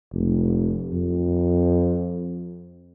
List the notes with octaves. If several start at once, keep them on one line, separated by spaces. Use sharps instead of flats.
F1
F2